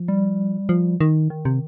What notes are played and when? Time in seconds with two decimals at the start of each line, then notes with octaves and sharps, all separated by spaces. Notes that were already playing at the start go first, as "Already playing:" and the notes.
Already playing: F3
0.08 G3
0.69 F3
1.01 D#3
1.30 D#3
1.45 C3